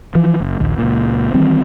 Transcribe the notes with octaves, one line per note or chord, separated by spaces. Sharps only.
E3 F3
F#1
A#1 D#2
C#2 A#2
D#3 E3 G3 C4